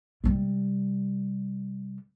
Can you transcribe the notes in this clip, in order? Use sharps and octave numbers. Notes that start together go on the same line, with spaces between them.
C3 G3